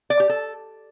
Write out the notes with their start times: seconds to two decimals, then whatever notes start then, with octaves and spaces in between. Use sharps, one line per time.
0.10 D5
0.20 G4
0.29 A4